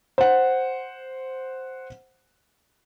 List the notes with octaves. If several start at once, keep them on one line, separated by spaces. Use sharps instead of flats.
C5 F#5